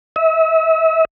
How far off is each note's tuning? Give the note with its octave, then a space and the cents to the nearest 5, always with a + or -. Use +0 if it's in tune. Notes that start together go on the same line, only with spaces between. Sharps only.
E5 -35